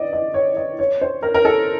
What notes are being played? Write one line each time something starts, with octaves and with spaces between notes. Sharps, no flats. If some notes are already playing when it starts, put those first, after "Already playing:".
Already playing: D5 D#5
D#5
C#5
D#5
C#5
C5
A#4
A#4
A4